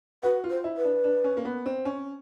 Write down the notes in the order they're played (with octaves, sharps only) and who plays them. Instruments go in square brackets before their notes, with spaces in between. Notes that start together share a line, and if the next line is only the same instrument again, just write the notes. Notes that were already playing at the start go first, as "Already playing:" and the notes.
[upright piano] F#4 [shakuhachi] B4
[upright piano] F4
[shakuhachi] C5
[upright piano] E4
[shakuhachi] B4
[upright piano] D4
D4
C#4
A#3
B3
C4
C#4